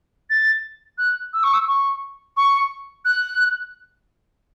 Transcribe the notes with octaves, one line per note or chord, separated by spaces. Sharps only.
A6
F#6
E6
C#6
E6
C#6
C#6
F#6